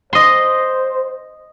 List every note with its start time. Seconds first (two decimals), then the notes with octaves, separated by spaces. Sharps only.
0.13 C5 D#5 C6